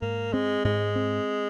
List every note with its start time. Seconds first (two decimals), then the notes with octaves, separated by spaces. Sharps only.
0.02 G#2 A#3
0.33 G#3 C4
0.64 G#2 G#3
0.96 C4